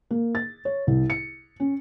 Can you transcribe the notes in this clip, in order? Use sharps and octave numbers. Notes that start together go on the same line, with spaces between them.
A#3
A6
C#5
C2
C#7
C#4